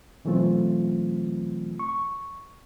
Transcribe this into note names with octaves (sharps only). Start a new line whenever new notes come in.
B2 E3 F#3 A3 C4 F4
C#6